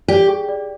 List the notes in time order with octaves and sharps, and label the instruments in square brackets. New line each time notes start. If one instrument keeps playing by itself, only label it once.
[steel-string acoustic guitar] G4 [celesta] D5
[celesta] G#4
D5